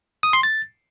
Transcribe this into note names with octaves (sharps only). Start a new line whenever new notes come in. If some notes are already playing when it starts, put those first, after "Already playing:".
D#6
C6
A6